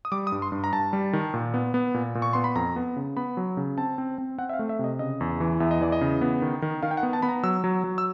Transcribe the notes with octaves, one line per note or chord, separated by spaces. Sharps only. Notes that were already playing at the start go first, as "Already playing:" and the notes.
D#6
G3 D6
D#6
G2
C6
G2
A#5
G2 A5
G3
D#3
A#2
B3
B3
A#2
A#2
C#6
B3 C6
B5
F2 A#5
B3
C#3
B3 B5
F#3
C#3
C4 A5
C4
C4
C4 F#5
E5
F5
A3
E5
C3 D#5
C#3 D#5
E2
E3
E2 E5
D#5
E3 D5
D#5
C#3
B3
D#3
D#3
D#3 F5
G5
F#5
B3
A5
B3 B5
A#5
F#3 E6
F#3
F#3
E6